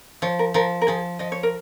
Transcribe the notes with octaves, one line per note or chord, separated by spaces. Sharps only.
F3 C#5
A#4
F3 A#4
A#4
F3 G#4
F3 D#5
C#5
A#4